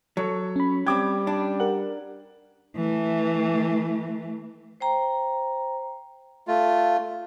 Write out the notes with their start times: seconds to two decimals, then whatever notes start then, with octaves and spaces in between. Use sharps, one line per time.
0.17 F#3 A4 C#5
0.56 C#4 B5
0.87 G3 C4 G4 D6 G#6
1.27 D4
1.60 G4 A#4 F#5 F#7
2.76 E3 A3
4.80 C5 G5 A#5
6.48 A3 F4